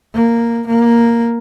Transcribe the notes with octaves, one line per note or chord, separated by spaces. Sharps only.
A#3
A#3